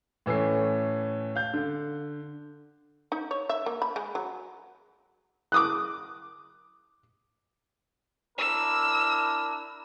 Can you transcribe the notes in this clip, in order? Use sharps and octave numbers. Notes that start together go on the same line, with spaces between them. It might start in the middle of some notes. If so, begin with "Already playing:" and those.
A2 E3 A3 C#4 C7
F5 G6
D3
D#4
C#5
E5
A#3
B5
G#3
F#3
D6 D#6 F#6
D4 E4 A#4 E6